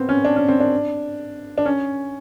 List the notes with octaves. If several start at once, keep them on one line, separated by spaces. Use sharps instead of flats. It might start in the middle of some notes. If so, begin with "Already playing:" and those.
Already playing: B3 C4
C#4
D4
C#4
C4
D4
D4
C#4